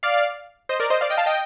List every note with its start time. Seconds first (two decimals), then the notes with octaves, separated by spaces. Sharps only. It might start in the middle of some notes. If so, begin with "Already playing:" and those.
0.03 D5 F5
0.69 C5 D#5
0.80 A#4 D5
0.90 C5 D#5
1.01 D5 F5
1.10 D#5 G5
1.17 F5 A5
1.26 D#5 G5